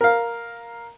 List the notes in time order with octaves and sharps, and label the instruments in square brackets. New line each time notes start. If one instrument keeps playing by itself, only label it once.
[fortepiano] A#4 F5